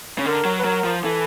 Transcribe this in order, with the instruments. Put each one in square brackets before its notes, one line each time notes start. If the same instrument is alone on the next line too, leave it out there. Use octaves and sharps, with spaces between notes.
[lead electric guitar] C#3
[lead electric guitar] D3 [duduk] A#4
[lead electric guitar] F#3
[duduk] B4
[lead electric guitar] F#3 [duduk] A#4
[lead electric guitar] F3
[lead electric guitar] E3 [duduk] A4